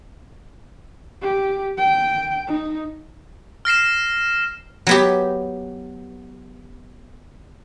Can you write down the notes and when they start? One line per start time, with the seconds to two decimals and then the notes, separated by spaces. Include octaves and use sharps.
1.22 G4
1.78 G5
2.47 D#4
3.65 F6 A#6 C7 E7
4.87 F#3 B3 G4